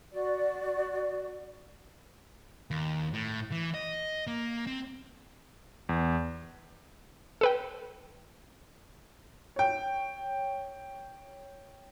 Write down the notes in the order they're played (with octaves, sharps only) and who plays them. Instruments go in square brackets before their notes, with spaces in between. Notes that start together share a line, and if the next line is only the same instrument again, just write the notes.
[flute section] F#4 D5
[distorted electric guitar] D#2
A2
E3
D#5
A#3
C4
[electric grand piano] E2
[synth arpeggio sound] A4 B4 G5
[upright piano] C#5 G5